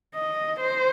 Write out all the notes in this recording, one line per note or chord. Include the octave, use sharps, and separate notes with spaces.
D#5
C5